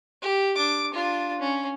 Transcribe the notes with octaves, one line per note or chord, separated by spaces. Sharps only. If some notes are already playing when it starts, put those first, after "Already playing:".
G4
D4 D6
D4 F4
C#4